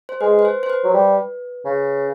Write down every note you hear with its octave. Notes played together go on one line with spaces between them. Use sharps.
C5
G#3 B4
B4
C5
C5
B4
F#3
G3
C#3